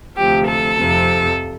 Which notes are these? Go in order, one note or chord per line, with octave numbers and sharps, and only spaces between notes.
D2 C3 F3 G4
A4
F2 C3 F3